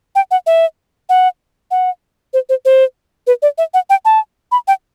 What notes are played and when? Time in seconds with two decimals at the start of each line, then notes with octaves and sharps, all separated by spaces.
0.15 G5
0.31 F#5
0.47 E5
1.09 F#5
1.71 F#5
2.34 C5
2.49 C5
2.65 C5
3.27 B4
3.42 D5
3.58 E5
3.74 F#5
3.90 G5
4.05 A5
4.52 B5
4.68 G5